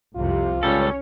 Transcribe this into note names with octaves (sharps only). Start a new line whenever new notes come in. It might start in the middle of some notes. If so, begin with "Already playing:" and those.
C2 F2 C3 F4
C#2 G3 C#4 A4 C#5